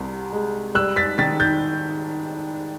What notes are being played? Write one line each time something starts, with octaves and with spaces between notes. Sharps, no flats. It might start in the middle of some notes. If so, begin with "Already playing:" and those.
Already playing: C2 C3
G#3
G3 E6 F#6
A6 B6
D#3 A6 B6
G6 A6